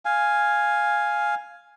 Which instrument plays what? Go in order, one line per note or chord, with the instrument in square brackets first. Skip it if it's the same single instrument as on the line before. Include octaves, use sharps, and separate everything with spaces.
[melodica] F5 G#5